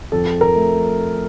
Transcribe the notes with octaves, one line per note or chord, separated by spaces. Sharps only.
F2 A4
A#4
A3